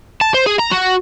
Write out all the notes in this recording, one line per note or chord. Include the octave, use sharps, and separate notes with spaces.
A5
C5
G#4
A#5
F#4